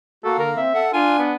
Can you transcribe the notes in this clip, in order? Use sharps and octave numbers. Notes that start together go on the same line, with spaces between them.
A#3 F#4 A4
D3 A#4
C4 E5
A4 F#5
D4 F4 G#5
B3